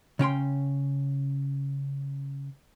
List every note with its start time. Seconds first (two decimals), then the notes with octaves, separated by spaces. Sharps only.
0.19 C#3 C#4 G5 C6